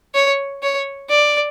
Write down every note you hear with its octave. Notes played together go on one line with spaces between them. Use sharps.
C#5
C#5
D5